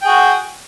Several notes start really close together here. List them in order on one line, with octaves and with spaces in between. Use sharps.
G5 G#4 F#4